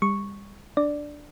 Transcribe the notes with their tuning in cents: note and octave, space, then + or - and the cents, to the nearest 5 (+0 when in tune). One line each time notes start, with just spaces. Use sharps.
G3 +35 C#6 -5
D4 +0 D5 +0